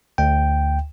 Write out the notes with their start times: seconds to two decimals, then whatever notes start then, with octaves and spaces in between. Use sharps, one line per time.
0.18 D2 G5